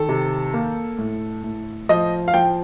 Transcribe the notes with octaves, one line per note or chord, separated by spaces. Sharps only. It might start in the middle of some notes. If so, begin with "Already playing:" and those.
Already playing: D#3 A4
C3
A#3
A2
A2
F3 D#5
F5
F3 G5